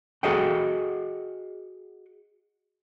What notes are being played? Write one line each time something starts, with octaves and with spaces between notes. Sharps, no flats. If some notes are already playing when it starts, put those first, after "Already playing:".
F#4 G#4 A4 D#5 F#5 G5